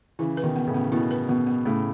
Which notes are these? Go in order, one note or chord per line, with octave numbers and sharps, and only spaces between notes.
C#3 E3 E4
B4
B2 D#3
B3
A2 C#3
B3
B2 E4
B4
B2 B3
B3
A2 C#3 A3